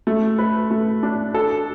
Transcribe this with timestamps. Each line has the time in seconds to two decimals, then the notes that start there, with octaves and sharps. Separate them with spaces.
0.07 A3
0.38 B4
0.71 A3
1.03 D4
1.34 A4